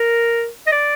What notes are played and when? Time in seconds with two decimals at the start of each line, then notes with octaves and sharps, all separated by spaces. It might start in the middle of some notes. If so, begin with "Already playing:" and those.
Already playing: A#4
0.67 D#5
0.72 D5